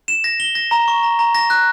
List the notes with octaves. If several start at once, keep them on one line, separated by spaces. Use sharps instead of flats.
E7
A#6
G7
A#6
A#5
C#6
A#5
A#5
A#6
F#6